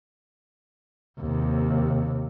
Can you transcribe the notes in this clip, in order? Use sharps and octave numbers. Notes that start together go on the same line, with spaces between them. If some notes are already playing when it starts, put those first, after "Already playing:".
D#2 C3